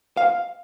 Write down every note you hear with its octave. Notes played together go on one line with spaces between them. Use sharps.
F5